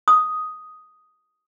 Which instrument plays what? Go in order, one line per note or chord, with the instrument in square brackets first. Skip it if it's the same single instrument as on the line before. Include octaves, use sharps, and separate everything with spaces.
[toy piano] D#6